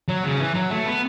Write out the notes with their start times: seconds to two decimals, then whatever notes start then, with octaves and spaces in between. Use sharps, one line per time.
0.08 F#3
0.24 C#3
0.38 E3
0.54 F#3
0.71 A3
0.86 B3